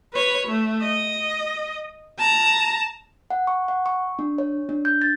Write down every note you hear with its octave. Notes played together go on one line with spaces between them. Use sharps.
B4 C#5
A3
D#5
A5 A#5
F#5
C#6
F#5
C#6
D4
C#5
D4
G6
A6